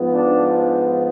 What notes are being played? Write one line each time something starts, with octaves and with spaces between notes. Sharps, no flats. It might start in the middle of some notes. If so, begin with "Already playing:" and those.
Already playing: G#2 F3 B3
D4